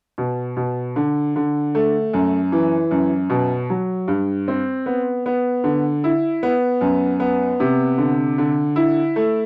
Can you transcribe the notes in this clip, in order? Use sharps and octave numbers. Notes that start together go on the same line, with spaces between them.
B2
B2
D3
D3
A3
F#2
E3
F#2
B2
F#3
G2
C4
B3
B3
D3
E4
B3
F#2
B3
C3
D3
D3
E4
A3